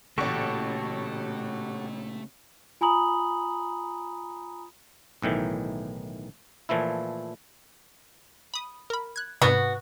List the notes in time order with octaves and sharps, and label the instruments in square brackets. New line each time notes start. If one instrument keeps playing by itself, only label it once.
[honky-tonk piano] A1 C#6 [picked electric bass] A#2 C#3 [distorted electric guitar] A3 [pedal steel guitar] F#4 G4 A4
[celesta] F4 G#5 A#5 B5 D#6 F#7
[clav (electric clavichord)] B1 A2 D#3 E3
A#2 E3 F3 A3 E4
[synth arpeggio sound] B5 D#6
A#4 B5
F#6 G#6
[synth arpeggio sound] G#2 C3 [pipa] B3 F#4